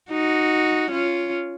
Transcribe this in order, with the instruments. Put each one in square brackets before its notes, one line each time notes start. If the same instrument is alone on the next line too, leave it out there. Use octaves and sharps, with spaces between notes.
[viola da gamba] D#4 F#4
C#4 F4